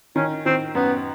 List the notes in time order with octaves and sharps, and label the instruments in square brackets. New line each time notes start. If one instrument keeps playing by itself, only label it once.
[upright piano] D#3 [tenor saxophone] C#4
[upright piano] D#3 [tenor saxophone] C4
[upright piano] F#2 [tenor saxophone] B3